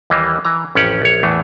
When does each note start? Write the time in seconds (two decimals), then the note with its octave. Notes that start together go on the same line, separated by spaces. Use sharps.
0.10 D#2 E3 G3 A#3
0.45 E3 A#5
0.75 A1 F2 C#4 G4 F#5
1.02 A#1 C#5
1.23 E2 A2 E3 A3